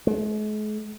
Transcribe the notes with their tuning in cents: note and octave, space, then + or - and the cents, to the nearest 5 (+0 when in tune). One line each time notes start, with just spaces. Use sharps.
G#3 +45